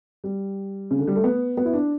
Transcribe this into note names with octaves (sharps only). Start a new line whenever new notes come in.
G3
C#3
D3
G3
A3
B3
B3
E4
D4